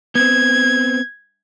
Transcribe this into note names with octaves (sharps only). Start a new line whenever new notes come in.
B3 C4 G#6